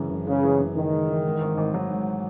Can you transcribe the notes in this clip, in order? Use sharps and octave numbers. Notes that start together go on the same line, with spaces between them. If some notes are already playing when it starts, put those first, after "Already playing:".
Already playing: F#1 F#2 E3 G#3
F#1
C#3 G#3
E3
F#2
F#1 D#3
G#3
E3
G#2
G#1
G#1
F#3
G#2